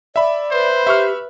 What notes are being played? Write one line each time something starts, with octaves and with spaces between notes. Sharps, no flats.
D5 E5 B5
B4 C5
G4 E5 C#6 F6